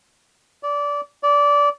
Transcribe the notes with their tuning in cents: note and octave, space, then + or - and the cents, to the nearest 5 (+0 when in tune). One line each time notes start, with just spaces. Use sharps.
D5 -20
D5 -20